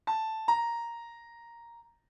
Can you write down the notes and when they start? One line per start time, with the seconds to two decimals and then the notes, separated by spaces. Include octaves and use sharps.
0.07 A5
0.48 A#5